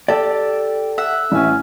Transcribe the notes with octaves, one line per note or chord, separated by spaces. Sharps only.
G4 A4 D5 A5
E5 F#5
A1 C#4 G#5